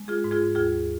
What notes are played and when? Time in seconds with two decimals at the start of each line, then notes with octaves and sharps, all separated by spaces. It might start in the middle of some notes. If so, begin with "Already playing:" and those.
Already playing: G#3
0.08 F4 G#4
0.24 G#2
0.31 F4 G#4
0.55 D#2 F4 G#4